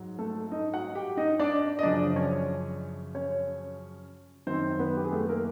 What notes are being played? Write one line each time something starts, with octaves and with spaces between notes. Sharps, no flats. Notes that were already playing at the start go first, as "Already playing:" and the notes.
Already playing: G#2 F#3
A3 A4
D#4 D#5
F#4 F#5
G4 G5
D#4 D#5
D4 D5
D#5
F#2 C#3 F3 D4 D5
C#4 C#5
C#4 C#5
F#2 D#3 F#3 C4 C5
B3 B4
G4
G#4
A3 A4
A#3 A#4